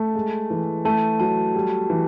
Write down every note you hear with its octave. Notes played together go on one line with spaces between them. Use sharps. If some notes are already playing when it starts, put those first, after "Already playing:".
Already playing: A3 A5
G#3
E3
A3 A5
F#3 A5
G3
E3